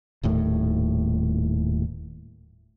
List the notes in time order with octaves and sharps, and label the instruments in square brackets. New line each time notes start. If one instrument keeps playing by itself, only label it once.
[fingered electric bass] D#1 D#2 A2